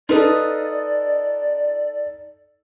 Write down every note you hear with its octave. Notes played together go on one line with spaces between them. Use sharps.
D#4 F4 A4 B4 D5 D#5